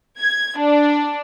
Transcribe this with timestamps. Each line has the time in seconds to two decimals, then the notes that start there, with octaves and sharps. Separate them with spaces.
0.19 G#6
0.57 D4